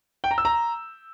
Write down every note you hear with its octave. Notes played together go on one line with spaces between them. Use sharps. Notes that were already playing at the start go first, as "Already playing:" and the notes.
G5
A#5
E6
A#5